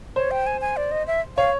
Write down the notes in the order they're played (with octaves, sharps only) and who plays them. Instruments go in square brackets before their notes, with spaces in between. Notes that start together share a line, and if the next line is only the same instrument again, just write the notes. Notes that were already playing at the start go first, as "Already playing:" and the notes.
[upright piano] C5 [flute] C#5
[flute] G5
G#5
G#5
D5
D#5
E5
[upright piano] C#5 [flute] F5